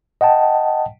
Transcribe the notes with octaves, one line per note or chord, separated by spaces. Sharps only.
D#5 F#5 G5 A5